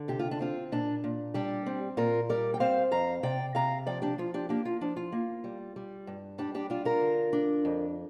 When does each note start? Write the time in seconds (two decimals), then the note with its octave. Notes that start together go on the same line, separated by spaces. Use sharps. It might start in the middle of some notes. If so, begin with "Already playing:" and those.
Already playing: D3
0.08 C3 G4
0.19 F4
0.31 D4
0.41 C4 F4
0.72 A#2 D4
1.04 A#2
1.34 G3 D4 G4
1.66 C4
1.97 A#2 F4 A#4
2.29 G3 A#4 D5
2.54 G5
2.60 C4 C5 F5
2.91 F2 F5 A#5
3.23 C3 D5 G5
3.55 C3 F5 A#5
3.86 F3 D5 G5
4.02 D4 G4
4.18 F3 F4
4.34 D4 G4
4.49 A#3 D4 G4
4.65 F4
4.81 F3 D4
4.96 F4
5.12 A#3
5.44 G3
5.76 G3
6.07 G2
6.38 G3 D4 G4
6.54 D4 G4
6.70 D4 F4
6.85 F4 A#4
7.01 D3
7.33 D4
7.65 F2